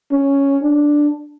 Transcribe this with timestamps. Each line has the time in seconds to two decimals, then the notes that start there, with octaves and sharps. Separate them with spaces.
0.12 C#4
0.64 D4